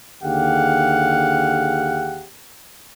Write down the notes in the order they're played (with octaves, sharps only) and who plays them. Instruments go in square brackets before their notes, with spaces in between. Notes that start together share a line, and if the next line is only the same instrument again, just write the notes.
[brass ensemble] D#2 D3 G4 G#4 F5 F#5